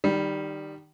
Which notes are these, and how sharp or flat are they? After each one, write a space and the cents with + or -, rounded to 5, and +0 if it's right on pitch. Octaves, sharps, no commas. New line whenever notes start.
D#3 -20 G3 +0